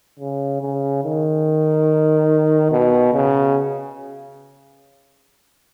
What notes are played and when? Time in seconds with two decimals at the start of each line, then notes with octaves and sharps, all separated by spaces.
0.20 C#3
0.62 C#3
1.04 D#3
2.72 B2
3.13 C#3